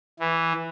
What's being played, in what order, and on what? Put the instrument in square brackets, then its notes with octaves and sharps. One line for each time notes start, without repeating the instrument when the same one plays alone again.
[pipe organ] E3